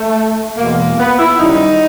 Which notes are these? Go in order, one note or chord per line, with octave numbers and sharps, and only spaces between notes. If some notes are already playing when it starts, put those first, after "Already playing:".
Already playing: A3
E2 B2 G#3 A#3
A#3
B3
E4
F#2 D#3 G3 D#4